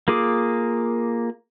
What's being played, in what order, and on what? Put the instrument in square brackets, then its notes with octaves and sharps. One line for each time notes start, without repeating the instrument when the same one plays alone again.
[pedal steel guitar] A#3 F4 G#4 D6